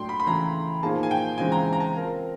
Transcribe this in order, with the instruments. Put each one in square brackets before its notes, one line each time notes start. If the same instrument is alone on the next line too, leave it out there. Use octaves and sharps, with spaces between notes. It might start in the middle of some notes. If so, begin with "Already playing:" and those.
Already playing: [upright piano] A2 F#3 A3 D4 [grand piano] G5 C6
[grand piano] B5
B5
[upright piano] C#3 E3 A3 [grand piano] A#5
[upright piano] A#2 F3 A#3 D#4 G#4 [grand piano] A5
[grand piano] G#5
G5
[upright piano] C#3 E3 G#3 C4 F4 [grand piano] G#5
[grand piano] A#5
A#5
A5
[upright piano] C4 F4 A#4